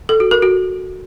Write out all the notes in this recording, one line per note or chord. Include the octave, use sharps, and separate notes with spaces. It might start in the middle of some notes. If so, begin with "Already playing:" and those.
A4
F#4
A#4
F#4